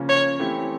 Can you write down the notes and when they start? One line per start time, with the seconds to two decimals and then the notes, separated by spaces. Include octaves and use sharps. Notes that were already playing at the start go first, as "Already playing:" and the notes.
Already playing: C#3 F3 A#3 C#4
0.09 C#5
0.40 E3 A3 C4 E4 G4